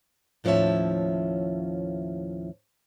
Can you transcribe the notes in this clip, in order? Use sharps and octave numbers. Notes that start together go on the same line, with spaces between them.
D#2 A2 F3 C#4 C#5 E5